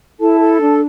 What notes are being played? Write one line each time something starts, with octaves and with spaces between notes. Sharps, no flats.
E4 A4 A5
A4
D4